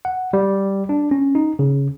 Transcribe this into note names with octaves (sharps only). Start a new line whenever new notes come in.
F#5
G3
D4
C#4
D#4
C#3